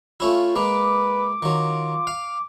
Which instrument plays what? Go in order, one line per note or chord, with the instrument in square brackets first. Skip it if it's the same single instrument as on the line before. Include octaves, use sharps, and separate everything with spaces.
[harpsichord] A3 C#4 E4 [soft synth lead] F4
[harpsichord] G#3 A#3 [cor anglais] B4 [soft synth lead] D6
[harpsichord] D#3 F#3 [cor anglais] F4
[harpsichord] F5